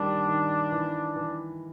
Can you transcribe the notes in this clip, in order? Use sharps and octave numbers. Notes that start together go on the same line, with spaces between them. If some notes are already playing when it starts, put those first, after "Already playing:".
Already playing: D#3 G3 A#3 D4
D#3
E3
E3